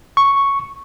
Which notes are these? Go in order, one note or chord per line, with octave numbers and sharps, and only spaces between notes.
C#6